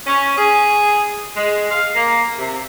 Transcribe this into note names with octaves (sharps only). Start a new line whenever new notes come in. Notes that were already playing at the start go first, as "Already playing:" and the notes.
C#4
G#4
G#3
F5
A#3
C3